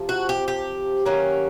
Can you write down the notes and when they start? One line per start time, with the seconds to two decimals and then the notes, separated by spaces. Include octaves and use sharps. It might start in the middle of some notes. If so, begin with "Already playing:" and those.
Already playing: C3 F3
0.09 F#4
0.29 G4
0.48 G4
1.06 D#3 F#3 A#3 C#4